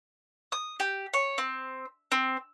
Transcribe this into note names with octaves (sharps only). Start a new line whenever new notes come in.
D#6
G4
C#5
C4
C4